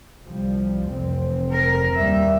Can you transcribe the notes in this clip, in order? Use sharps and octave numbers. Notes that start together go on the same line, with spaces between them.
C2 F3 G3
F1 E3 C4
A#4
D#2 B2 G3 A#3 E5